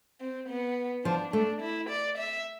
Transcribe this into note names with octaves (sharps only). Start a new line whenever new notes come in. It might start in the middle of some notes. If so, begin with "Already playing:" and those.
C4
B3
F3 D4
A3 D4
E4
D5
E5